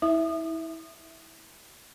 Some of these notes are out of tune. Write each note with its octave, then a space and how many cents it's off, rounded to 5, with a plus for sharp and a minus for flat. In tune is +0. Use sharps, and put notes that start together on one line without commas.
E4 -30 E5 +0 D#6 -30